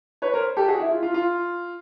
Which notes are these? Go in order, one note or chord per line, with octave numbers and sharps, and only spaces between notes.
B4 C#5
A#4 C5
G4 A4
F#4 G#4
E4
F4
F4
F4